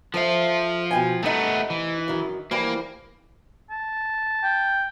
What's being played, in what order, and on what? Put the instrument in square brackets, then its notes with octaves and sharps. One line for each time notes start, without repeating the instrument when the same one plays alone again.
[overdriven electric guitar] F3 F4 [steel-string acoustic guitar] A4 C5 E5
[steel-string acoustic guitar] B2 G5 G#5
[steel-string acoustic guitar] C3 D#4 [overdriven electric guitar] A3 B3
[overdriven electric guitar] E3
[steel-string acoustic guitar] F#2 D#3
[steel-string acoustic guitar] E3 F3 G3 [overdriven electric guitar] A#3
[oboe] A5
[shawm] G5